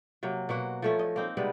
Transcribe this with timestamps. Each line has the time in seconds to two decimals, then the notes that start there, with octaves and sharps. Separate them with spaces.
0.23 C3 F#3 A#3
0.49 B2 A#3 F#4
0.82 F3 A3 C#4
0.99 D#5
1.16 A#3 C4 D#4
1.37 C3 G3 G#3 B3